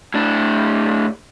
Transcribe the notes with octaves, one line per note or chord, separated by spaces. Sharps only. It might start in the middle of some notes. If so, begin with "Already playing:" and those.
A2 D4